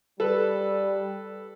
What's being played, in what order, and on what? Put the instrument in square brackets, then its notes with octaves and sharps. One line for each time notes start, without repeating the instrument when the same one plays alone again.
[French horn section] G3 [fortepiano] A4 B4